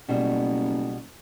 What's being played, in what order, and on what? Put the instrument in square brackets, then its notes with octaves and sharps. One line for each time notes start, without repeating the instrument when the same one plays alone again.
[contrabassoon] F#1 [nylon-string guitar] B2 G3